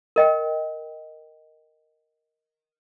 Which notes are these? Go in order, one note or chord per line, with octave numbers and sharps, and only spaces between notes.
A#4 D#5 G5